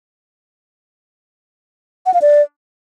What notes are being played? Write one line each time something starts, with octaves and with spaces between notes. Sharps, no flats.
F#5
F5
D5